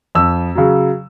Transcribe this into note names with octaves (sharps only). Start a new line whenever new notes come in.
F2 E6
C#3 F#3